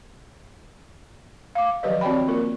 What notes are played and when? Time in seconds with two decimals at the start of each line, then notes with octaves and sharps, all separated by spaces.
1.55 F5 D6
1.83 D#3 F3 F#3 G4 B4 D#5
2.01 C4 F#4 C#5 D5 G5 B5
2.27 A#3 F4 A#4